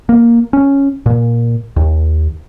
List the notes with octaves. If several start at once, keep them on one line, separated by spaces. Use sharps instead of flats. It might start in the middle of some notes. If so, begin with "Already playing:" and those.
A#3
C#4
A#2
D#2